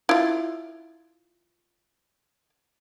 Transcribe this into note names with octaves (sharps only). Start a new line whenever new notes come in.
E4 F4